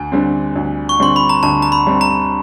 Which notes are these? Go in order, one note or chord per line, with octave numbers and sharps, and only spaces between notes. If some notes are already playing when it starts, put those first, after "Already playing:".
Already playing: D2 G#5
D3 G3 C4
D2
C#6
D3 G3 C4 C6
B5
A#5
D2 A5
A#5
B5
D3 G3 C4
A#5